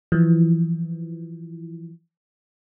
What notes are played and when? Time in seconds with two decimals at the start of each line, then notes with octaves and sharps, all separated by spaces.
0.12 E3 F3